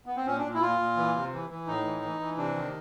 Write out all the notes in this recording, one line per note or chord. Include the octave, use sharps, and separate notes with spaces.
B3
C4
A#2 C#4
D4
A#2
E4
A#2 F4
A#2
E3
C3
E3
E3
A2 D#4
E3
E3
E3
C3 D4
D#3